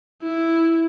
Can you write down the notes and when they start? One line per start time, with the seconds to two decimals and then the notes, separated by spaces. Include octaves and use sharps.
0.23 E4